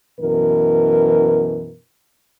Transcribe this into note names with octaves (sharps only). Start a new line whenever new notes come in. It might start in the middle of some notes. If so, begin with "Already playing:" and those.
F#2 B2 E3 A#4